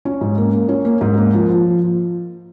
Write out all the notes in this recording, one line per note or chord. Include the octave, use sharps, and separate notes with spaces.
C#4
G#2
A#3
A#3
C#4
A#3
G#2
A#3
F3
F3